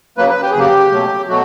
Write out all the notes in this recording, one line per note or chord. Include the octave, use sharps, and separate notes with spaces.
C#3 F#3 A#3 B4
B4
G4
G#4
C#3 F#3 A#3 G4
B2 F#3 A3
B2 F#3 A3 F#4